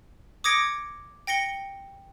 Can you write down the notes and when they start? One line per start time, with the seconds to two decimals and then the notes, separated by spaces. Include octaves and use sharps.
0.44 D6 D#6 G#6 A#6 C#7 D7
1.27 G5 A#6 C#7 G7